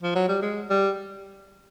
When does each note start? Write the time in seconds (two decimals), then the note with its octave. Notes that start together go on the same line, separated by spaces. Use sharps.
0.03 F3
0.15 F#3
0.29 G3
0.42 G#3
0.70 G3